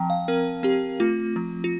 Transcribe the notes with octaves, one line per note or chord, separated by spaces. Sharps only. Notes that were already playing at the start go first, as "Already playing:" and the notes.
Already playing: F3 C4 G5 A5 A#5
F5
C4 A#4
C4 G4
A3 F4
F3
F4